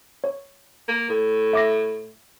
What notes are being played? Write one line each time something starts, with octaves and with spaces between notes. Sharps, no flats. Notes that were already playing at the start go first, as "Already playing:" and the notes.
C#5
A#3
A2
E5 D6 A#6